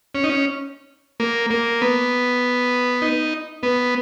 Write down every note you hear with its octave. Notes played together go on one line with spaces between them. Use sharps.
C#4
D#4
C#4
A#3
A#3
B3
D#4
B3